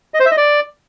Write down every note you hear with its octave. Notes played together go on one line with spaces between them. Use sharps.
D#5
C5
E5
D#5
D5